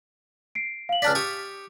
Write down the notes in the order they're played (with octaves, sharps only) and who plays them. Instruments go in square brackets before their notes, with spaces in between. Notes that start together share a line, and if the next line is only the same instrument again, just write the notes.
[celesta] C7 D7
F5 F#7
[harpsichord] C#2 D4 D5 [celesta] F6 A6 B6
[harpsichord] G4 C#6 D#6